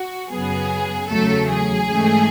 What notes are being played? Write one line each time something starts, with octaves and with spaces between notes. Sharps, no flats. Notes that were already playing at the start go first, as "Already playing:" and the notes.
Already playing: F#4
F#2 C#3 F#3 B3 G#4
E2 C#3 F#3 A3 A4
G#4
G#2 E3 A3 C#4